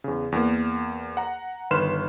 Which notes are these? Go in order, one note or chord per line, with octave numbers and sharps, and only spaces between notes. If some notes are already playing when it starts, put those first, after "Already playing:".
E2 C#3
E2 A#3
F#5 A#5
G1 D#3 B4 C6 F6 E7